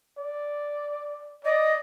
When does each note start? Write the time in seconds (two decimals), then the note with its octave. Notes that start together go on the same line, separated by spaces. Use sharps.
0.17 D5
1.44 D5 D#5